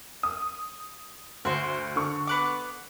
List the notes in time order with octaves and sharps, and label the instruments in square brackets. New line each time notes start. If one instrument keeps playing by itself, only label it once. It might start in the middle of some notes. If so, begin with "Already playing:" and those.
[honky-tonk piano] D#6
[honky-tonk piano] D2 [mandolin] F#4 C5
[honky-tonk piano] D3 C#6
[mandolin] B3 F#5 D6